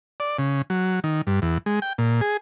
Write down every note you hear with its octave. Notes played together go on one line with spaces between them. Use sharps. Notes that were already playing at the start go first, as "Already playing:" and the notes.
D5
C#3
F#3
D#3
G2
E2
G#3
G5
A#2
G#4